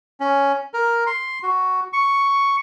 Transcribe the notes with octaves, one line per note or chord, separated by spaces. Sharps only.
C#4
A#4
C6
F#4
C#6